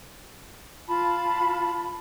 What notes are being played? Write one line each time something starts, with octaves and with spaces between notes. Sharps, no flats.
F4 A5 B5